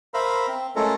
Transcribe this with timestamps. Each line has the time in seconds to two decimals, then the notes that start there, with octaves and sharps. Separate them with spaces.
0.14 A#4 C5 E5 F5 B5
0.48 C4
0.76 G#3 A3 C#4 F4 A4 A#4